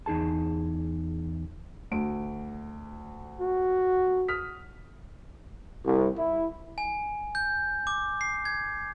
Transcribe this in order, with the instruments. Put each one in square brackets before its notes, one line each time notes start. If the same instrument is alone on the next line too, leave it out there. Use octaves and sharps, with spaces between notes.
[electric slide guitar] E2 D#4 G#4 A5
[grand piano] D2 D7
[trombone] F#4
[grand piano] D#6 F6 B6
[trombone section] C2
E4
[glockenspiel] G#5
G6
D6
C7
G#6